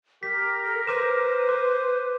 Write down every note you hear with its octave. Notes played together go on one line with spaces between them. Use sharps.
G4 A#4 B6
A4
B4 C5 D6 E7
D6